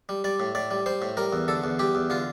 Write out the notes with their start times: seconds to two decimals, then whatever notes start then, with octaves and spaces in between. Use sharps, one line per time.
0.09 G3
0.24 G3 D5
0.40 A2
0.55 A2 D5
0.71 G3
0.86 G3 C5
1.02 A2
1.17 G3 A#4
1.32 E2
1.48 D3 A4
1.64 E2
1.79 G3 G4
1.95 E2
2.10 D3 F4